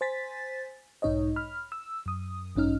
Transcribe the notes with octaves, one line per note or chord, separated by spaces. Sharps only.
C5 G#5 A6 B6
B1 G#2 D#4 C#5 D#5
B5 F6
E6
F#2 D#6
A1 G2 C#4 D#4 F6